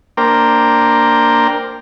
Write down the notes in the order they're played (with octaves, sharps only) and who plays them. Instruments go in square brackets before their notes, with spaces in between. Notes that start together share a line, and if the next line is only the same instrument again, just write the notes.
[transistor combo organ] A#3 D4 A#4 C5 G5